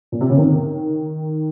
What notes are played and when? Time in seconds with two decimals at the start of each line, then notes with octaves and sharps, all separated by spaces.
0.12 A#2
0.21 C3
0.30 C#3
0.37 D#3